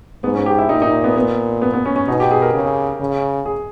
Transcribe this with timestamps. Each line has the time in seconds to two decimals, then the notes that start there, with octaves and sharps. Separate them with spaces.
0.24 G#2 B3
0.35 C#4
0.46 G4
0.58 E4
0.69 A#2 D#4
0.82 D#4
1.04 B3
1.16 B3
1.62 B3
1.73 B3
1.85 C#4
1.96 C#4
2.07 B2 D#4
2.20 G4
2.31 G#4
2.42 A#4
2.53 C#3 G#4
3.00 C#3
3.46 G#4